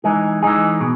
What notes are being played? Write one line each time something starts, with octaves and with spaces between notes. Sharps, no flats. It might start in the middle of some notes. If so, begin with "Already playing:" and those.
E3 G#3 D#4 G#4
E3 G#3 D#4 G#4
B2